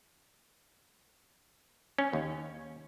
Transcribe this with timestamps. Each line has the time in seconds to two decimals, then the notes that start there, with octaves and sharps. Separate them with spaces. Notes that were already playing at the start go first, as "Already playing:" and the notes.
1.98 C#4
2.13 D#2